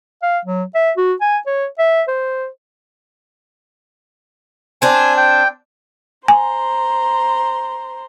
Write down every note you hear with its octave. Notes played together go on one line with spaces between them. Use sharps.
F5
F#3
E5
F#4
G#5
C#5
E5
C5
C4 D4 G#5
G5
C5 G#5 A#5 C6